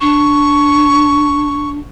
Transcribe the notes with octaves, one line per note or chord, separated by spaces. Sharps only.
D4 C#6